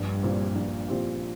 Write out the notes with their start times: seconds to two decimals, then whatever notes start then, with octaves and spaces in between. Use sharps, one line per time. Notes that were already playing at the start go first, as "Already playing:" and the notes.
Already playing: A#1 G2
0.23 A#2 F3 C4 G4
0.55 A#1
0.88 A#2 F3 C4 G4